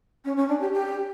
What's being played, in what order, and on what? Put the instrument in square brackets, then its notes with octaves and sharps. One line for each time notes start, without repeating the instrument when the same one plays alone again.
[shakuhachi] C#4
C#4
D4
G4
G4